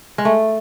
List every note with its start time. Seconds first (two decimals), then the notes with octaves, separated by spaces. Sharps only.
0.18 G#3
0.25 A3